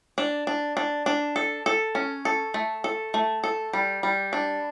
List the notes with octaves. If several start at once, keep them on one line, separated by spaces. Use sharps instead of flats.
D4
D4
D4
D4
A4
A4
C#4
A4
A3
A4
A3
A4
G3
G3
D4